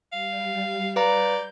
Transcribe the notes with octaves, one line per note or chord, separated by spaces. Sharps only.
G3 F5
B4 D5 F5 A#5 G6